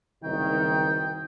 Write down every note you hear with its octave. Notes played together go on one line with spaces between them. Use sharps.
F#1 C2 D#3 G5